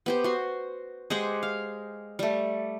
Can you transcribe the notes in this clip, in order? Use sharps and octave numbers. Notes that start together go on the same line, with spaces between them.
B3 G4 C5
F#4 C6
G#3 G4 C5 F#5
F5
G3 A3